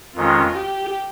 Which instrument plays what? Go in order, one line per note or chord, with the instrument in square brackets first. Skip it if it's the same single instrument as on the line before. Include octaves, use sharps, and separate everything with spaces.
[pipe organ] F2 D#3 G#3 C#4 [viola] F4
[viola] G4